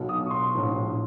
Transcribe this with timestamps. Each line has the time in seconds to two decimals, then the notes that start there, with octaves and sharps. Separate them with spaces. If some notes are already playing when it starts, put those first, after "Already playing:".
Already playing: B1 B2
0.09 D#6
0.26 C#6
0.31 C6
0.54 A#1 A2 E3